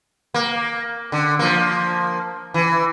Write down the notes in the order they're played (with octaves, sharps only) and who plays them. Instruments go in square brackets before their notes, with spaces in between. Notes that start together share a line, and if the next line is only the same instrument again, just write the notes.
[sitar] A#3
D3
F3 A#3
E3